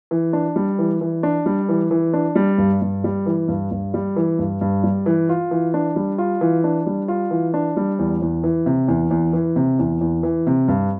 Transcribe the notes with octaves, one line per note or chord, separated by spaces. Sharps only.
E3
D4
G3
E3
E3
D4
G3
E3
E3
D4
G3
G2
G2
G3
E3
G2
G2
G3
E3
G2
G2
G3
E3
F4
E3
D4
G3
F4
E3
D4
G3
F4
E3
D4
G3
E2
E2
E3
C3
E2
E2
E3
C3
E2
E2
E3
C3
G2